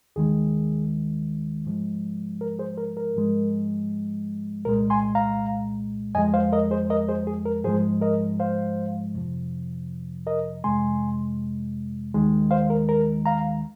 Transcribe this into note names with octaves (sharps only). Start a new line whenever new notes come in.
D#2 D#3 G#3 G#4
G#2 F3 G#3
A#4
G#4 C5
A#4
A#4
G#2 F3 G#3
C2 A#2 G#3 A#4
G#5 C6
F5 A#5
F2 F3 G#3 D#5 G#5
C5 F5
A#4 D#5
G#4 C5
A#4 D#5
G#4 C5
G#4
A#4
G#2 F3 G#3 G#4 C5
A#4 D#5
C5 F5
F2 C3 F3
A#4 D#5
F2 C3 G#3 G#5 C6
D#2 D#3 G#3
C5 F5
A#4
A#4
F5 A#5